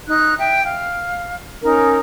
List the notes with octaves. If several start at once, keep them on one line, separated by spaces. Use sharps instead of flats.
D#4 F#6
E5 G5
F5
C#4 D#4 A#4